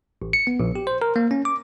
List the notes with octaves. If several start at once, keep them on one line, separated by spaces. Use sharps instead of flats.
A1
C#7
B3
A#1
G4
C5
A#4
A#3
C#4
D6